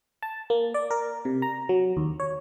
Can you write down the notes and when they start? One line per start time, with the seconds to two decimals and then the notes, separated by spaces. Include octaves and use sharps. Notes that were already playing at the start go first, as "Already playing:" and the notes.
0.23 A5
0.50 A#3
0.74 D5
0.91 A#4
1.25 C3
1.42 A#5
1.69 F#3
1.97 D#2
2.20 C#5